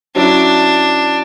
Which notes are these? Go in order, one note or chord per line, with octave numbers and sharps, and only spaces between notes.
F#3 C#4 D4 E4